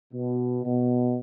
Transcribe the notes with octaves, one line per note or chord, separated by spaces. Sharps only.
B2
B2